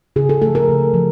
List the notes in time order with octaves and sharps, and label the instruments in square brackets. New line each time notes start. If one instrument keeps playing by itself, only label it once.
[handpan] C#3 G#4
A4
F3 A3 A4
A#4
C#3
F3